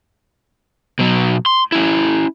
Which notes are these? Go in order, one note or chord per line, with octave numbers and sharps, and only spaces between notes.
B2 F#3
C6
C#4 E4